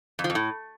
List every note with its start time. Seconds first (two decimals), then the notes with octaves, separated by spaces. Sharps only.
0.19 F2
0.24 F3
0.30 F2
0.35 A2